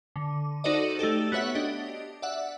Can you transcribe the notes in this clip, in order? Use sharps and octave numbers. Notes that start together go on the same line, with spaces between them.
D3
D#4 F#4 A4 C5 D5 D#5
A3 D#4 G4 A4
B3 F#4 C#5 E5 F#5
D4 G4 D#5
D5 E5 F#5